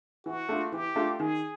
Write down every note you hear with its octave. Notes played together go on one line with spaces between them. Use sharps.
E3 F#4
A3 D4 F4
E3 G4
A3 D4 F4
D#3 G#4